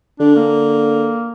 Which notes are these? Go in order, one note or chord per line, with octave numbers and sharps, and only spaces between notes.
D3 D4
A#3